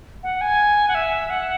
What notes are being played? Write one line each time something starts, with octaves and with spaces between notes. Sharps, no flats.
F#5
G#5
F#5
E5
F#5